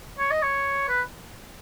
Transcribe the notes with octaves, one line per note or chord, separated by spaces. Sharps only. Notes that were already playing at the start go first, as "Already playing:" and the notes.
C#5
D#5
C#5
B4